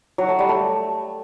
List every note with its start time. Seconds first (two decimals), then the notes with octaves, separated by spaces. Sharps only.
0.18 F#3
0.29 A3
0.39 G3
0.49 A3